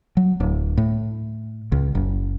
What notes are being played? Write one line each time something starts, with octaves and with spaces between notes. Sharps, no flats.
F#3
D1
A2
C#2
F#1